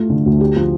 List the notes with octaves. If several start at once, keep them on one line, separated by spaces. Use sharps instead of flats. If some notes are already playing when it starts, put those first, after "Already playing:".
Already playing: A3 F4
D3
D2
G4
F3